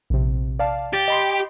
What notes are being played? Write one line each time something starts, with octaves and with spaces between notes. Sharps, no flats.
A#1 C3
D5 F5 A5
G4 A6
D#5 B5 C6